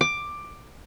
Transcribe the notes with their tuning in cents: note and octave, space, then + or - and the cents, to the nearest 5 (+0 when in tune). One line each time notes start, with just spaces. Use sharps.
D6 +10